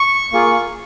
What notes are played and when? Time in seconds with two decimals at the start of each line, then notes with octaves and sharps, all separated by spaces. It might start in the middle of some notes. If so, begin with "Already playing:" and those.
Already playing: C#6
0.33 A#3 F4 G#4